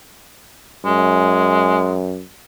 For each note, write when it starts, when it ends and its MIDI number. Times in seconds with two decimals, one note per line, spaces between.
0.85 2.24 42
0.85 1.98 56